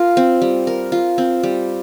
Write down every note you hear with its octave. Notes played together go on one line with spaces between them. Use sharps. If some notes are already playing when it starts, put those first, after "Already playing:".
Already playing: F4 A#4
C4
G3
A#4
F4
C4
G3